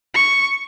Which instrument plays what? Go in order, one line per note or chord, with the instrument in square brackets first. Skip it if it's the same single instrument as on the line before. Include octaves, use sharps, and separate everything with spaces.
[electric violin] C#6